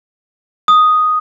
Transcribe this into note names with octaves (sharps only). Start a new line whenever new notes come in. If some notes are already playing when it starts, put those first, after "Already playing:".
D#6